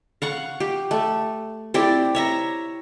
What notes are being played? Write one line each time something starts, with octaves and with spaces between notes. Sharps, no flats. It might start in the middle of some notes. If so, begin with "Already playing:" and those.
F5 F#5 C#6
G4
A3
C4 E4 G4 D5
C#5 E5 A#5